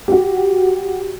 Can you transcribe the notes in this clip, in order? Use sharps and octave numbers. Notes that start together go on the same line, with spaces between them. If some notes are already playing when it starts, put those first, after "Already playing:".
F#4 G4